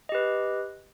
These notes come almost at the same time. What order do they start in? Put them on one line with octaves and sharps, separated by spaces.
D#5 G4 B4